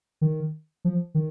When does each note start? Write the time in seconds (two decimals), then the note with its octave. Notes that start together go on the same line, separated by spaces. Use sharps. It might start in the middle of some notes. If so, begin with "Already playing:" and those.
0.21 D#3
0.85 F3
1.15 D#3